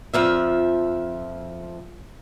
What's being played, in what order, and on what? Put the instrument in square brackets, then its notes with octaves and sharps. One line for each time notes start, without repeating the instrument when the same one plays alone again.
[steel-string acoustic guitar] F2 F3 E5